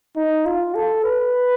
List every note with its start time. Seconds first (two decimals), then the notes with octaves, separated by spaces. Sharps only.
0.16 D#4
0.45 F4
0.74 A4
1.04 B4